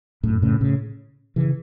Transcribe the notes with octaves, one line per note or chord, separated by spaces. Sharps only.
F#2 A2
A2 C#3
A2 C#3
C#3 E3